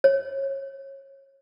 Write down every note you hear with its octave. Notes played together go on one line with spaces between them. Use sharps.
C#5